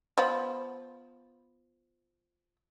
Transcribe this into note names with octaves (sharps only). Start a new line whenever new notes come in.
F3 B3 B5